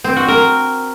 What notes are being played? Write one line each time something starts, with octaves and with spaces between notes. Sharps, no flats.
C4
F#4
A#4